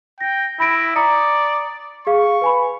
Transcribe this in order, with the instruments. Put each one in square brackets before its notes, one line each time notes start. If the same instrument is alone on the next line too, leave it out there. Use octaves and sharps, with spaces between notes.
[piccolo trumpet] G5 [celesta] A#6
[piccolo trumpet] E4 [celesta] B5 A#6 D7
[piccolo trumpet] D5 [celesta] A#5 D#6 C#7
[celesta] G#4 F5 [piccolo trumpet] C#6
[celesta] B4 G#5 B5